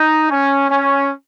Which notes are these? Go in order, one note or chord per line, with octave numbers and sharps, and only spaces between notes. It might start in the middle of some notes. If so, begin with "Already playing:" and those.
Already playing: D#4
C#4
C#4